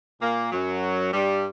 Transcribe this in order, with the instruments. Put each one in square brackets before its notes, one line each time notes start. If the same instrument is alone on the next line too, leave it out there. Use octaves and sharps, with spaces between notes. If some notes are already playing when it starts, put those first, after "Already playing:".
[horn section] A#2 A#3
F#2 F#3
G2 G3